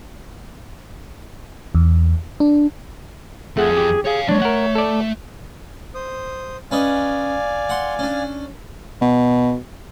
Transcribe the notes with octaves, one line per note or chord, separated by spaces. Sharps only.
E2
D4
F2 A3 G#4 F#5
G4
G#4 C#5 F5
F#3 G#3 D4 C#5
A3 A#4 F#5
A4 D5
C5 D#6
C#4 B4 D5 D#5 F5 G#5
F#5 C6
C#4 D4
B2